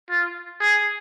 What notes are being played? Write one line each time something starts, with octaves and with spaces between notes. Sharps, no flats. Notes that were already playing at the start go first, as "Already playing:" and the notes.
F4
G#4